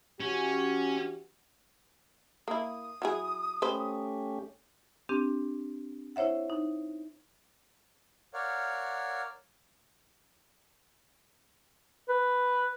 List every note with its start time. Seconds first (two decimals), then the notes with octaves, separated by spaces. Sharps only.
0.20 E3 C#4 F#4 G4
2.48 A#3 E4 D#6
3.02 F#3 E4 G#4
3.62 A3 C#4 G4 B4 C5
5.09 C4 D4 G4
6.16 E4 C5 C#5 E5 F#5
6.50 D#4
8.34 A#4 C#5 D5 F5 F#5
12.09 B4